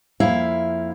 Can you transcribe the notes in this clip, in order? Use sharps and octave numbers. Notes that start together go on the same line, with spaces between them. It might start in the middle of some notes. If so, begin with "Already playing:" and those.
F2 A#3 E4 E5 F5